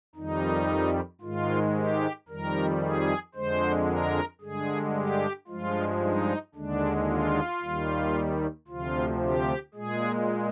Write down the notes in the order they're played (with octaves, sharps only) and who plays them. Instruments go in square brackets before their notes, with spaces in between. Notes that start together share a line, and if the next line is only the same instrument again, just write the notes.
[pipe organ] F2 D#3 G3 D#4
G#2 D#3 G#3 F4
G4
F2 D#3 G3 A#4
G#4
F2 D3 G#3 C5
A#4
G2 D3 G#3 G#4
G4
G2 F3 G#3 F4
D#4
D#2 D3 G#3 D4
F4
D#2 D#3 G3
D2 C3 F3 F4
G4
A#2 G#3 G#4